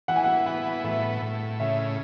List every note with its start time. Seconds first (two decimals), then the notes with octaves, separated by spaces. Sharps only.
0.08 E3 F#5
0.16 G#5
0.24 F#5
0.46 B3 F#5
0.84 A2 E5
1.22 A2
1.60 C#3 E5